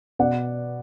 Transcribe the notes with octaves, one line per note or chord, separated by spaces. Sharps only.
B2 D5 F#5